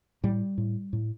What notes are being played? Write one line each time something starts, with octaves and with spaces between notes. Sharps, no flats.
A2 G3
A2
A2